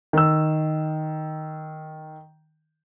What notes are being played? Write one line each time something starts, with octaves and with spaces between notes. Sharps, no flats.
D#3 E6